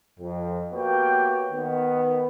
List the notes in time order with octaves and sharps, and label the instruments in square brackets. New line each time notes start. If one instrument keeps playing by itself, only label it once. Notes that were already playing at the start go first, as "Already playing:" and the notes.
[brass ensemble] F2
A#3 B3 F#4 G4 C#5 G5
D#3 B3